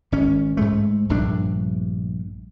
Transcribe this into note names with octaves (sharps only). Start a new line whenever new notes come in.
G#1 C#4
G#2 G#3 A3
A#1 G2 A3 D4